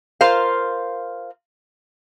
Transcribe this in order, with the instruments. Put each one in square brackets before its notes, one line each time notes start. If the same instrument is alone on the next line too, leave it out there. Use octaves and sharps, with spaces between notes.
[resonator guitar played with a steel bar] F4 A#4 C5 F5